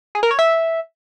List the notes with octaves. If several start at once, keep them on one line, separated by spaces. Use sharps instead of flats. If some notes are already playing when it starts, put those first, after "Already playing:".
G#4
A#4
C#5
E5